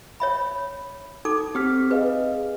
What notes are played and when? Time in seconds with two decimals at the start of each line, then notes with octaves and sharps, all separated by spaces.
0.20 C#5 E5 B5
1.25 D#4 A4 D6
1.55 C4 G4 F6 B6
1.91 G#4 B4 D#5 F5